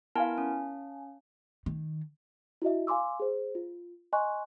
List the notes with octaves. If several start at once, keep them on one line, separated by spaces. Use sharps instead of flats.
B3 E4 A#4 F5 G#5 A5
C#4
D#3
E4 F#4 D#5 E5
F5 G#5 C6 D6 E6
G#4 C5
F4
D#5 G#5 C6 C#6 F#6